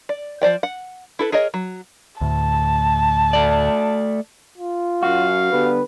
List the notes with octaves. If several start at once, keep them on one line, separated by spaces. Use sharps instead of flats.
D5
F3 C5 D5 G5
F#5
E4 A4 B4
G#4 A#4 C#5 D#5
F#3
D2 A2 A5
A3 D5
F4
F#2 F#4 F5
D3 G3 B3 B4